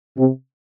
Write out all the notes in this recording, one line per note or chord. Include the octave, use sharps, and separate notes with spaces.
C3